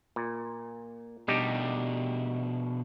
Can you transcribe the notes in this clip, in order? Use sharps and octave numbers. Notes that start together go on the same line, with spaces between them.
A#2
B2 G3 D4 D#4 G4